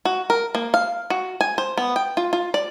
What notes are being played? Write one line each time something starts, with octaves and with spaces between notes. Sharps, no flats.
F#4
A#4
A#3
F5
F#4
G#5
C5
B3
G5
F4
F4
D5